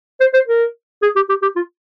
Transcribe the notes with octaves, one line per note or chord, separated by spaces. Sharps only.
C5
C5
A#4
G#4
G4
G4
G4
F4